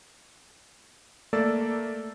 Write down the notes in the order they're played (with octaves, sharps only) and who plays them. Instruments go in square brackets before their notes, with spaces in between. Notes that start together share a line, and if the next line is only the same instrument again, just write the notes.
[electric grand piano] A3 A#3 A4 D5 E6 A6